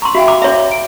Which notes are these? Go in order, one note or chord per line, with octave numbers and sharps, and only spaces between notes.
A#5 C6 C#6
F#4 E5 F5 G5
A#5 D6
C#5 E5 A#5
D7